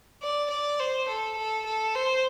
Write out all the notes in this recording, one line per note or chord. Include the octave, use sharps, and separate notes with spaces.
D5
D5
C5
A4
A4
A4
C5